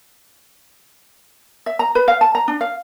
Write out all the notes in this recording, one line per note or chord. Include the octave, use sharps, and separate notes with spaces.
E5
A#5
B4
F5
A5
A#5
D4
F5